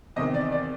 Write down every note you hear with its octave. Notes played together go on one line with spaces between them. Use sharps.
E2 C3 D#3 D#5
D5
D5